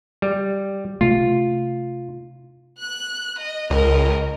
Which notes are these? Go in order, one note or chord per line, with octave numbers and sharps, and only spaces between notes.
G3
C3 A3 F4
F#6
D#5
C#2 A#4 D#5